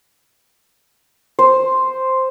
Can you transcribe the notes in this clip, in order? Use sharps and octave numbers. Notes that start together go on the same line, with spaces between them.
C5